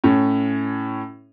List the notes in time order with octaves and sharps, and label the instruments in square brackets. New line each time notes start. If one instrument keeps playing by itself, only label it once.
[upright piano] A2 C#4